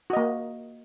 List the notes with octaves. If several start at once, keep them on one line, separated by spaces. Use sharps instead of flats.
A#3 F#4 D#5